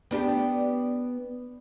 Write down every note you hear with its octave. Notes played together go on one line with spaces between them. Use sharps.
B3 D4 G4